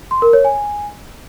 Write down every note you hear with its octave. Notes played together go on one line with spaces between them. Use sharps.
C6
A#4
C#5
G#5